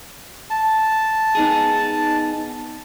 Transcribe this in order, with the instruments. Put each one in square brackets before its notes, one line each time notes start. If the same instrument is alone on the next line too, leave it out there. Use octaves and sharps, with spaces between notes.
[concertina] A5
[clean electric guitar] B3 D#4 G#4